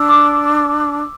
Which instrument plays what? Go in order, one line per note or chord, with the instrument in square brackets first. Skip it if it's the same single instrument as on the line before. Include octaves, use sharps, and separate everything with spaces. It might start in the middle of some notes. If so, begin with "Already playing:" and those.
Already playing: [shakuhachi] D4 [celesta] E6
[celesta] D6